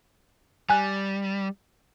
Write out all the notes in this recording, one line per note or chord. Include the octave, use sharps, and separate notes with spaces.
G3 G#5 F#6